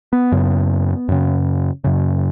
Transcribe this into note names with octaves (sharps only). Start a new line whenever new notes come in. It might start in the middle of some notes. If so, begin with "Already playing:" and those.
B3
F#2 C#3
F#2 C#3
F#2 C#3